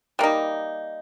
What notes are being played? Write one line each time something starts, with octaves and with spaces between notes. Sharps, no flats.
G3 A#3 D#4